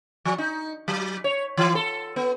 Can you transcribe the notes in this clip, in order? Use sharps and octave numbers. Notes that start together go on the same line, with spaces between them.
F3
D#4
F#3
C#5
E3
A4
B3